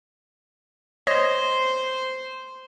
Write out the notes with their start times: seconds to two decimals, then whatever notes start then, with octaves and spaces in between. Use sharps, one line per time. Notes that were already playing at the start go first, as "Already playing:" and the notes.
1.07 C5 C#5 D#5